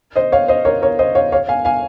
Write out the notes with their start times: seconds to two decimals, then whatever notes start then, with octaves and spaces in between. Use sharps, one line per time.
0.16 C5 D#5
0.32 C#5 F5
0.48 C5 D#5
0.65 A#4 C#5
0.82 A#4 C#5
0.99 C5 D#5
1.15 C#5 F5
1.32 C#5 F5
1.48 F5 G#5
1.65 F5 G#5